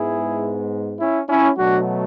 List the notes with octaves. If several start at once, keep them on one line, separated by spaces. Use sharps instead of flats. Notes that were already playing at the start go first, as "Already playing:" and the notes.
Already playing: G#2 G#3 B3 E4 G#4
C#4 E4
C#4 E4
B2 F#3 A3 D4 F#4